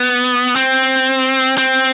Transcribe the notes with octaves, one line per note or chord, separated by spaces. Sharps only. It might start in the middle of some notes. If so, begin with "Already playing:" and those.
Already playing: B3
C4
C4